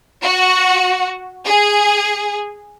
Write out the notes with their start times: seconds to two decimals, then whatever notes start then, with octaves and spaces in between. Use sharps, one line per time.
0.23 F#4 F#5
1.46 G#4